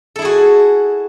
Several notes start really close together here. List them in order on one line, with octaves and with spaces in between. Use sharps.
A4 E4 G#4 F#4